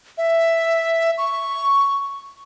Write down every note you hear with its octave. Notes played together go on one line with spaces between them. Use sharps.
E5
C#6